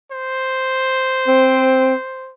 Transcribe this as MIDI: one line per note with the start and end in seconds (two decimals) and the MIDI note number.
0.11 2.32 72
1.28 1.94 60